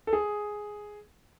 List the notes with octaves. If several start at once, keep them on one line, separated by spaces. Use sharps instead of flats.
A4
G#4